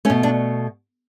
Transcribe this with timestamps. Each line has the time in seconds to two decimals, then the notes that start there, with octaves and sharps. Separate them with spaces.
0.05 A3 C#4
0.10 B2
0.23 D4